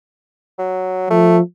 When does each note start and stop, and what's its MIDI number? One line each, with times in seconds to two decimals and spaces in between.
0.59 1.07 54
1.10 1.41 53
1.10 1.38 57